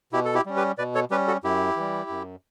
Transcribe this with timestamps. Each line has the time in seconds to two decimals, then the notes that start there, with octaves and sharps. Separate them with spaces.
0.12 B2 E4 G4
0.25 A4
0.35 E4 G4
0.46 G3 C#4
0.57 G4 B4
0.78 B2 B4 D5
0.95 A4 C#5
1.11 G3 C#4 G4 B4
1.27 F#4 A4
1.44 F#2 E4 G4
1.76 E3 G3
2.10 F#2